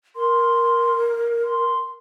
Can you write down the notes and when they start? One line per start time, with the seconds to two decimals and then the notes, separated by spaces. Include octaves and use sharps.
0.16 A#4 C6
1.44 C6